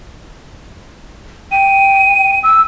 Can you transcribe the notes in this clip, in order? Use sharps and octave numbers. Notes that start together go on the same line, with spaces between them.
G5 D#7
E6